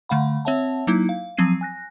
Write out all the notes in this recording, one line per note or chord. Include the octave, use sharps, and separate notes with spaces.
D3 A3 F5 F#5 B5
C4 C#5 E5 F#5 A5
F#3 A#3 D#4 E4
F5
F3 F#3 C4 G#6 C7 D#7
G#5 F#6 A#6